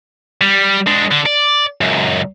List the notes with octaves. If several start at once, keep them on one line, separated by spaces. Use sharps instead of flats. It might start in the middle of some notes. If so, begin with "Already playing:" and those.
G3
G#3 D4
D3
D5
C#2 F#2